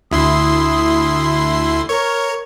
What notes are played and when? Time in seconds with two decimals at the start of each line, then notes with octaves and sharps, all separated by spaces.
0.11 D2 E4 C6 D#6
1.89 A#4 C#5